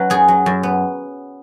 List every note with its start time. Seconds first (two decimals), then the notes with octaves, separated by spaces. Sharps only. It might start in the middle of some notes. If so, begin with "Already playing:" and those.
Already playing: F#3 C#4 B4
0.10 F#2 G#4
0.28 F#3
0.46 F#2
0.63 B3